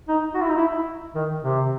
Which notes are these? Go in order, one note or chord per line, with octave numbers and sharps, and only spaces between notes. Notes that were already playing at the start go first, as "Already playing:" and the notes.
D#4
F#4
E4
D#4
E4
D#3
C3